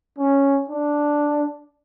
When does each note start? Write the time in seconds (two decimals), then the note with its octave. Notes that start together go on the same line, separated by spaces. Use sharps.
0.18 C#4
0.69 D4